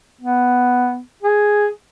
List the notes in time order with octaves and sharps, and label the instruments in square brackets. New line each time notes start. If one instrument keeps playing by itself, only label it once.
[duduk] B3
G#4